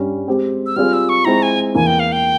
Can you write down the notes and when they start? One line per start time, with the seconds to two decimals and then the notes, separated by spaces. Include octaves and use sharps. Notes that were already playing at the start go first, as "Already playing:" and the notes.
Already playing: G2 G3 C#4
0.27 G#3 C4 G4
0.66 E6
0.76 G3 C4 F4 G#4 C5 F6
0.93 E6
1.09 C#6
1.25 G#3 C4 E4 A#5
1.42 G#5
1.74 E2 E3 A#3 E4 G#5
1.86 G5
1.99 F5
2.12 G5